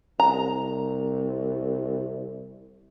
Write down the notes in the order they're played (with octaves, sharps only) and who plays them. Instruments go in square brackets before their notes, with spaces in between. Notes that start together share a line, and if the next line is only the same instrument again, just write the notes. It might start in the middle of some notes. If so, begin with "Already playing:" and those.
[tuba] C2 [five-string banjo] A#5